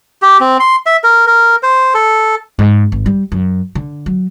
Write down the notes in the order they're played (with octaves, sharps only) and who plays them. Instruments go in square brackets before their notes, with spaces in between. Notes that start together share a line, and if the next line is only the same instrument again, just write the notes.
[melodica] G4
C4
C6
E5
A#4
A#4
C5
A4
[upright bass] G#2
G#1
G3
F#2
D3
F#3